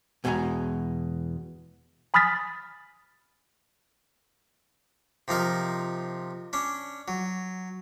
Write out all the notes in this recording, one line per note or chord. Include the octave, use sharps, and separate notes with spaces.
E2 B2 G#3 D#4 G#5 A#5
G#5 B5 D#6 F6 A6 B6
C3 F3 D#4 A#4
C#4 D4
F#3